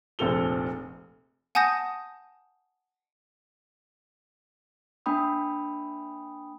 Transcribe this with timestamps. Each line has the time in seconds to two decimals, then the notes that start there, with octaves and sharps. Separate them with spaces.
0.19 F1 A#1 C4 A4 F7 G7
1.55 F#5 G#5 A5 D#6 G6 A#6
5.06 A#3 D4 G5 B5 D#6